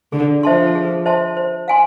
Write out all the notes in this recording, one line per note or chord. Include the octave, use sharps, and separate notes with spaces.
D3 G#4
F3 C5 E5 A5 C6
G#4
C5 E5 A5 C6
C5
F5 G#5 C6